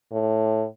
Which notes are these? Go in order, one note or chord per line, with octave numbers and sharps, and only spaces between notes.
A2